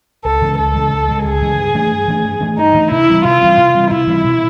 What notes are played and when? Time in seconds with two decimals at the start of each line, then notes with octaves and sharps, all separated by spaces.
0.24 C#2 A4
0.42 C#3 E3 G#3
0.58 C#2 A4
0.74 C#3 E3 G#3
0.91 C#2
1.08 C#3 E3 G#3
1.25 C#2 G#4
1.41 C#3 E3 G#3
1.58 G2
1.74 E3 A3 D4
1.91 G2
2.08 E3 A3 D4
2.24 G2
2.41 E3 A3 D4
2.57 G2 D#4
2.74 E3 A3 D4
2.90 C3 E4
3.08 E3 G3 C4
3.24 C3 F4
3.41 E3 G3 C4
3.57 C3
3.74 E3 G3 C4
3.91 C3 E4
4.07 E3 G3 C4
4.24 B2